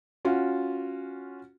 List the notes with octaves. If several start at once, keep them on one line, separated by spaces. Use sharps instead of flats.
C#4 F4 F#4